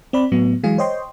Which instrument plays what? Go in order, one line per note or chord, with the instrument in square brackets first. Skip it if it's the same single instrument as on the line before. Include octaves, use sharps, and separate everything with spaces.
[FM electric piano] C4 D5 B5
A2 F#3 B3
E3 F#3 G#3 G#4 F5
C5 C#5 D#5 G5 C6